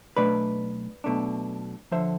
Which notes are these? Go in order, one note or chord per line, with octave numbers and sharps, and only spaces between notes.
B1 B2 A3 D4 B4 D5
B1 B2 A3 D4
D3 F3 C5 E5